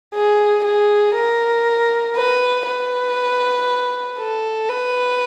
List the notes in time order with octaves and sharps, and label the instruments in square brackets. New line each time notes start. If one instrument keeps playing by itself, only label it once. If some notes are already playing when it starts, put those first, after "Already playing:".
[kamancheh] G#4
G#4
A#4
B4
B4
A4
B4